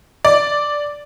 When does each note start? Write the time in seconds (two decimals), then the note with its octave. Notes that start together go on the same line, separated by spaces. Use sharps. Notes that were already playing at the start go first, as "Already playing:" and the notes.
0.25 D5